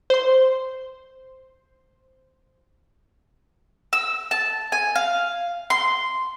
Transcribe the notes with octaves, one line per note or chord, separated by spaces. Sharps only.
C5 C6
E6
A5
G#5
F5
C6